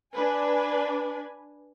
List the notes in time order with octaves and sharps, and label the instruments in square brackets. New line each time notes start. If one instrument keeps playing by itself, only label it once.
[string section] D4 B4 G#5